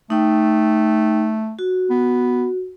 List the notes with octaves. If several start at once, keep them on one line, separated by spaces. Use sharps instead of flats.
A3 D#4 G5
F#4
B3